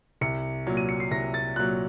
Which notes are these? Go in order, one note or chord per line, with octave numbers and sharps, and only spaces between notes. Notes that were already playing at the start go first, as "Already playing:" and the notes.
C2 C#7
A#2 F#3
D#7
C#7
C7
C2 A#6
A6
A#2 F#3 F#6